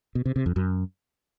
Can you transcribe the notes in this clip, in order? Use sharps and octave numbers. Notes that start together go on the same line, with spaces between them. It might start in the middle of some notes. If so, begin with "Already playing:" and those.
B2
C3
C3
F2
F#2